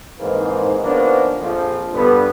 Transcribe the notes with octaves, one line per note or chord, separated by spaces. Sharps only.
F2 G#2 D#3 E3 G#3 A#3
D#3 F3 A#3 B3 C#4 D4
A#1 F2 F3
G2 D3 B3